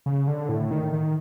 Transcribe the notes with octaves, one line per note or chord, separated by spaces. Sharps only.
C#3
D3
A2
D#3
D#3